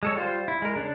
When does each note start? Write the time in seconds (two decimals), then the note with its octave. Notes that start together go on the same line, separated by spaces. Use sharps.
0.03 G#3 A4 C#5
0.16 G3 F4 C5
0.48 E4
0.62 G#3 A#4
0.76 C#3 D4